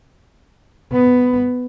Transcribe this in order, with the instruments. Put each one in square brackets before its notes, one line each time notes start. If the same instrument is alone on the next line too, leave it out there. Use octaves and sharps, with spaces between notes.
[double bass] B3